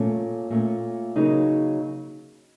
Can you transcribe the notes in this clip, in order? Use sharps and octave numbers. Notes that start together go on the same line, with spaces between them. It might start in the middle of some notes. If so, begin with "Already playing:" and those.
Already playing: A#2 A3 C#4
A#2 A3 C#4
C#3 F#3 A#3 D#4